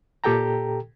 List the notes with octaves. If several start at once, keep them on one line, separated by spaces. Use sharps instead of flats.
A#2 G4 A4 G5 A#5